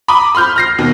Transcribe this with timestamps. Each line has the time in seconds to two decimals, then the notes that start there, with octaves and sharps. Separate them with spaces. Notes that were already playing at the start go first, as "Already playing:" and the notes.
0.08 A#5 B5 D6 D#6
0.35 B5 C6 F6 G6
0.56 F6 A#6 C7
0.78 D#2 B2